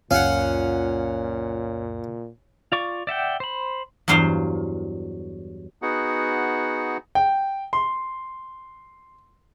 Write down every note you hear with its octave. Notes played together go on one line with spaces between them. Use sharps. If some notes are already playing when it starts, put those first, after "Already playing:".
C#2 F#2 A#2 C#4 F4 F5 F#5
F4 D5 C#6
D5 E5 F#5 G5
C5 B5
E2 G2 F#3 C5 F5
B3 D#4 F#4 G#4 F#5
G5
C6